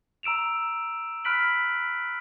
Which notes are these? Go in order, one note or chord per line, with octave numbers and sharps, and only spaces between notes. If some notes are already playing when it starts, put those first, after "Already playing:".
A#5 E6 D7 E7 F7
B5 F6 F#6 B6 D7 F#7